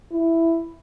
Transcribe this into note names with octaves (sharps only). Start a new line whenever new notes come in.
E4